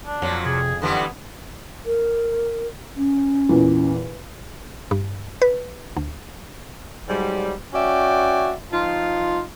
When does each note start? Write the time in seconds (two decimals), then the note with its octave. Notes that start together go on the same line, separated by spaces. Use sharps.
0.06 D4
0.22 F2 A#2 F#3
0.45 C3 G#4
0.82 D#1 D3 E3 G3 B3
1.86 A#4
2.97 C#4
3.49 E2 A#2 E3
4.91 G2
5.42 B4
5.97 D2
7.08 G#2 F#3 G3
7.73 C#4 F#4 D5 E5 G5
8.72 F3 D#4 F4